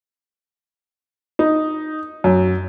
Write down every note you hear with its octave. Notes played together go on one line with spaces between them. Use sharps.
D#4
F#2